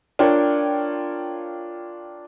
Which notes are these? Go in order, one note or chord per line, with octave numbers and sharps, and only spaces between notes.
D4 F4 A#4 C#5 G5